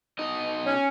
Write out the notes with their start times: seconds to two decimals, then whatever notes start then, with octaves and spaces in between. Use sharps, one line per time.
0.19 B2 D#4 D#5
0.65 C#4